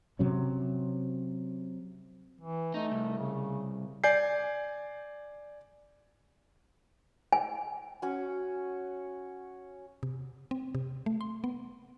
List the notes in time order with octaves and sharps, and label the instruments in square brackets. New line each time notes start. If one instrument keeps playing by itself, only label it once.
[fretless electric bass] C3 F#3 C#4
[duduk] E3
[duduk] A3 [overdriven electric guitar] D#4
[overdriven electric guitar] C2
[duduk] C#3
[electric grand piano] D5 G#5 G6 C7
[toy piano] G#5
[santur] C#4 F#4
[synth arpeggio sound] C3
C4
C3
A3
C6
B3